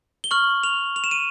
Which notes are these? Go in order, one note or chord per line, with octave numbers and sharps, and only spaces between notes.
G7
C#6 F6 F#7
F7
F7
E7
D#7